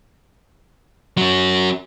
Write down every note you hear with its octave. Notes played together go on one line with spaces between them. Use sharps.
F#3 C#4